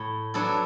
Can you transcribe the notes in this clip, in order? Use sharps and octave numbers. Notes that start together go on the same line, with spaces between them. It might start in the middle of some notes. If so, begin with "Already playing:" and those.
Already playing: A2
F#3 B3 D4 A4